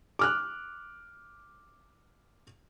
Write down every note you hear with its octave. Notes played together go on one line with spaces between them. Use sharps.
D6 F6 F#6